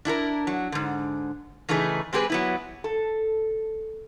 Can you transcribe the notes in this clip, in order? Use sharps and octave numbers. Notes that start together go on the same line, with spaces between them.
D4 E4 A4 A#4
F#3
G#2 D3
C#3 E3 A3 D#4 G#4
G#3 C4 G4 G#4 B4
F#3 B3 E4
A4